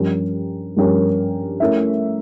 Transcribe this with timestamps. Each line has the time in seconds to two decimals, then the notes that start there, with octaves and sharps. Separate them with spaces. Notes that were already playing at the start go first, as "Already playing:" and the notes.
Already playing: G2 F3 C#4 G4 A#4
0.77 G2 F3 C#4 G4 A#4
1.60 A3 C#4 E4 A#4 E5